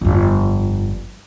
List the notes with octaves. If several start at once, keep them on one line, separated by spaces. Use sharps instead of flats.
G1 F2